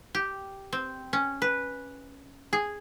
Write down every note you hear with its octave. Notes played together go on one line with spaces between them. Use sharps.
G4
C4
C#4
B4
G#4